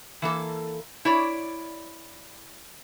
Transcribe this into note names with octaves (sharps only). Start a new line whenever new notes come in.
E3 A#3 A4
E4 C#5 D5